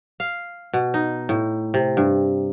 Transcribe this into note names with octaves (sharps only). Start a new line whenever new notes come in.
F5
B2
D#4
A2
C3
G2